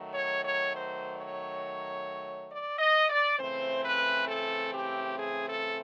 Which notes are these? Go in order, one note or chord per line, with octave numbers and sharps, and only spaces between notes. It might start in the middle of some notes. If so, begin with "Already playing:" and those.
Already playing: D#3 F#3 A3
C#5
C#5
C5
C#5
D5
D#5
D5
C#3 E3 A3 C4 C5
B4
A4
G4
G#4
A4